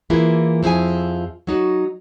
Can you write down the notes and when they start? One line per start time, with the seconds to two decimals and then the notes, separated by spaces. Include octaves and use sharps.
0.10 E3 A#3 E4 F4 G#4
0.63 F2 F3 E4 G#4 G#5
1.47 F#3 D#4 F#4